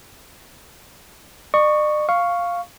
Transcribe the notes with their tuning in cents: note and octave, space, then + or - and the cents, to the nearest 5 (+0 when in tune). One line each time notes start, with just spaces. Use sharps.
D5 +45 C#6 +0
F5 +0 C#6 +0